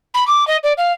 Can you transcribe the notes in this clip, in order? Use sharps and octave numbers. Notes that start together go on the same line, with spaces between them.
B5
D6
D#5
D5
F5